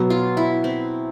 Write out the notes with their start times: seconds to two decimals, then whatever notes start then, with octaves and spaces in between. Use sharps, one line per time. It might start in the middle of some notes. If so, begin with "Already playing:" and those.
Already playing: B2 F#3 B3
0.10 F4
0.37 E4
0.64 C4